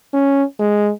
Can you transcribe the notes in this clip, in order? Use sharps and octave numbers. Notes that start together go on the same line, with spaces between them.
C#4
G#3